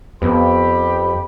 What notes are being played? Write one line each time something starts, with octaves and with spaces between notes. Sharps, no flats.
F2 B3 G4 B5